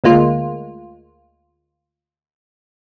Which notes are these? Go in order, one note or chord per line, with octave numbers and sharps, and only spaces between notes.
D2 G#3 A#3 F4